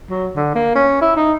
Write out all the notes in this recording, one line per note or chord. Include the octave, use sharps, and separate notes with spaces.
F#3
D3
A#3
C#4
E4
D#4